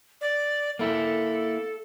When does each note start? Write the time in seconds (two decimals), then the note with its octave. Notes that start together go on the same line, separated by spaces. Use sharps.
0.21 D5
0.79 A#3 E4 A4